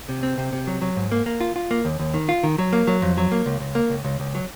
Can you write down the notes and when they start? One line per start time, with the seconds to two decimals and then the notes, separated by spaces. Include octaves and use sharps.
0.09 C3
0.23 C4
0.38 C3
0.53 C3
0.67 F#3
0.81 F#3
0.96 G#2
1.12 A#3
1.26 A#3
1.40 F4
1.56 F4
1.71 A#3
1.85 D#2
1.99 D#2
2.14 D#3
2.29 F4
2.43 D#3
2.58 F#3
2.73 A#3
2.87 F#3
3.02 F2
3.17 F#3
3.32 A#3
3.46 C#2
3.60 C#2
3.75 A#3
3.90 C#2
4.04 C#2
4.20 C#2
4.35 F#3